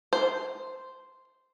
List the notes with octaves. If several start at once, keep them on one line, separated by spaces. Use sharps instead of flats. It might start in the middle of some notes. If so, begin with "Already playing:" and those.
C5